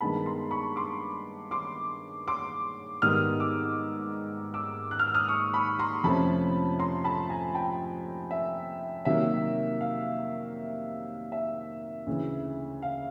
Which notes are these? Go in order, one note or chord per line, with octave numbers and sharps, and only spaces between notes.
G2 D#3 G#3 B3 A5 B5
A#5 C6
B5 C#6
C6 D6
C6 D6
C6 D6
G#2 D#3 G3 B3 D#6 F6
D6 E6
D6 E6
F#6
F6
E6
D#6 F6
C#6 D#6
B5 C#6
A#5 C6
F2 C3 F3 A3 C#4 A5 B5
A#5 C6
A5 B5
G#5 A#5
G5 A5
E5
C3 D#3 F#3 A#3 E5
F5
E5
D2 C#3 E3
F5